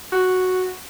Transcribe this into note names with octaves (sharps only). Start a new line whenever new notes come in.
F#4